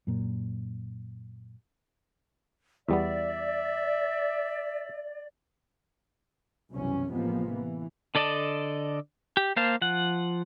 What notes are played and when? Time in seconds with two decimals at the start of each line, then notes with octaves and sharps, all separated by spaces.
0.07 F#2 A#2
2.89 E2 G3 B3 D5 E5
6.70 C2 F#2 B2 E3 C#4
7.10 A1 C3 F3 G#3 A#3 B3
7.52 E3
8.15 D3 A4 D5 D#5 A5
9.37 G4
9.56 A#3 C5 F5 A5
9.81 F3 F#5